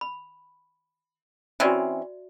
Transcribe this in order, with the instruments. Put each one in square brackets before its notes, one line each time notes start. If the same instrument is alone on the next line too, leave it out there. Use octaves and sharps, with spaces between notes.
[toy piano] B5
[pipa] E3 C4 C#4 [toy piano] F#4 D5 E5